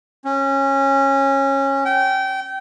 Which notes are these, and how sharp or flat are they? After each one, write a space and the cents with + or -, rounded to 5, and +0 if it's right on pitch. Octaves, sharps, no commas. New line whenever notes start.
C#4 -20
G5 -25